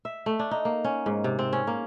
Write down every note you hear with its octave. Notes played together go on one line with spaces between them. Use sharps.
E5
A3
D4
D#4
A#3
C#4
G#2
C3
C4
C#4
A#3